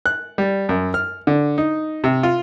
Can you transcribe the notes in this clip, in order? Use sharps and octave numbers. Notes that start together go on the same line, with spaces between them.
F#6
G3
F#2
F6
D3
D#4
C3
F4